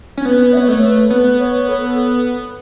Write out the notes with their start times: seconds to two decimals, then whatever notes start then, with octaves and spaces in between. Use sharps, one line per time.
0.17 C#4
0.25 B3 B4
0.53 E5
0.57 B3 C#5
0.68 A3
0.82 B4
1.10 B3 B4
1.39 C#5
1.68 A4